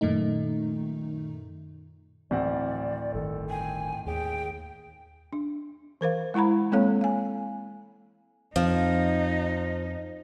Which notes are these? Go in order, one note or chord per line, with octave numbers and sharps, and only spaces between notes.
F#2 A#2 D#3 A3 D#4
D1 E3 C4 D5 F#5
G1 D#3 A4
G5 G#5
D#2 G#4 G5
D4
E3 A#4 C5 F5
G#3 E4 F#5 A#5 B5
G#3 A#3 C4 A4 C#5 F5
F5 G#5
F2 F3 D#4